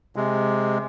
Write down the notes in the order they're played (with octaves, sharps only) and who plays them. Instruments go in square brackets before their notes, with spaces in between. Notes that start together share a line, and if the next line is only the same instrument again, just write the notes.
[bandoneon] C3 G#3